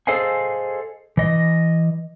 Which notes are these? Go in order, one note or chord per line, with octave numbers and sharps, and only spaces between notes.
G#4 A4 C5 D#5 F5 G#5
E3 D#5